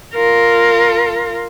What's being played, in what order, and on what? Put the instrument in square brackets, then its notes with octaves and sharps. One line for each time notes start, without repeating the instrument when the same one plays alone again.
[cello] F4 A#4